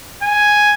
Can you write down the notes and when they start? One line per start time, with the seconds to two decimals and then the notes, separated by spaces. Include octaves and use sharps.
0.22 G#5